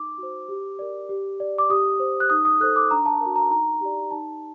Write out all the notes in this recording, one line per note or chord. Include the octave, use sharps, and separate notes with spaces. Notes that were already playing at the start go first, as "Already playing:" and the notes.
Already playing: D#4 D6
F#4 C5
G4
A#4 D5
G4
D5
D6
G4 D#6
C5
F#6
D#4 D#6
D#6
A4 C5 F#6
D6
D4 A#5
A5
F#4 A#4
A#5
D#4 A#5
G4 D5
D#4 A5